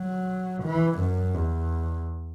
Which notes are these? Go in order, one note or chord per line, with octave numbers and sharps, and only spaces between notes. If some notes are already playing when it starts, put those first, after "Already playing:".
Already playing: F#3
E3
F#2
E2